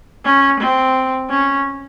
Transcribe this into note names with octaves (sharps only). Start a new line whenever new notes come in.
C#4
C4
C#4